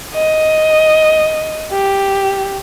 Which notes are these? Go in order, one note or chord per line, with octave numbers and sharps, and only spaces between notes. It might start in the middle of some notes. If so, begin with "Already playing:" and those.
D#5
G4